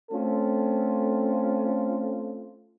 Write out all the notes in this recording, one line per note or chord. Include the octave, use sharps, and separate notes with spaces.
A3 C4 C#4 F4 A4